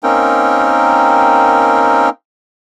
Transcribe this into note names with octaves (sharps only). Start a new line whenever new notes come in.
A#3 C4 C#4 D#4 A#4 G5